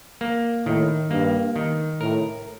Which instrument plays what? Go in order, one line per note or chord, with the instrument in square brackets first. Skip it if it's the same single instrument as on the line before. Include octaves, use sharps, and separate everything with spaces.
[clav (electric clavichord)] A#3
[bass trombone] A2 [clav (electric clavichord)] D#3
[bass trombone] G2 [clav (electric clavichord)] A#3
[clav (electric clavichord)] D#3
[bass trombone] A2 [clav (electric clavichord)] A#4